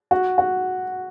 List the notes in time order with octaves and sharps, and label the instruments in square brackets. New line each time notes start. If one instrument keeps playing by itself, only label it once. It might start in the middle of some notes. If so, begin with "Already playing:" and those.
[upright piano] F#4
F#4